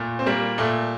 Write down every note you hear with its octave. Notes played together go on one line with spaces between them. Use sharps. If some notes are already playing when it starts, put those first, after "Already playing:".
Already playing: A#2 A3
C4
G3 A#3
A#2 A3